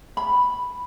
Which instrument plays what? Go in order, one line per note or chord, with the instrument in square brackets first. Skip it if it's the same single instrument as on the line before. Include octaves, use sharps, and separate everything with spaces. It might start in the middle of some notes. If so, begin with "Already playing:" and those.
[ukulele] B5